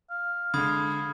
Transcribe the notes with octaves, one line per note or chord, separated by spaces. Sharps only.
F5
D3 G#3 B5 D#6 G#6